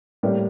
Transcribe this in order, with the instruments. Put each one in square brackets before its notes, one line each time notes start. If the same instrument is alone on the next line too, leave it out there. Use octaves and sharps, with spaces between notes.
[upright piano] A2 G3 A#3